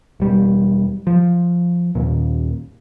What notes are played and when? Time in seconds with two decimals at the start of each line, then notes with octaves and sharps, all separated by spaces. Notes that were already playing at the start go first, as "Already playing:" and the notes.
0.20 E1 G3
1.07 F3
1.95 D#2 A#2